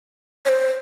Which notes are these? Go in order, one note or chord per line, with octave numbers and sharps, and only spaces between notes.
C#5
C5